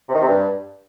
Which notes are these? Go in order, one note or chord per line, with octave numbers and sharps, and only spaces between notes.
C3
D#3
C3
G2